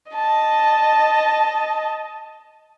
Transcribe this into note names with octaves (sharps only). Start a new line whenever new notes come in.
D#5 A5